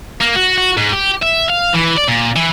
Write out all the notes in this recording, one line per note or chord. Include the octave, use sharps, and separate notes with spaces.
A#3
F#4
F#4
G#2
G4
E5
F5
E3
D5
A#2
E3